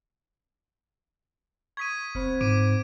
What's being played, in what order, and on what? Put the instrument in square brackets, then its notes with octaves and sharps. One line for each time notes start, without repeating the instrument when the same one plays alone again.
[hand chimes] C#6 D#6 [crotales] G#6 B6 D#7
[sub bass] F#1 [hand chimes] C4 C5 B5
[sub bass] G#2 [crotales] D6 D7 D#7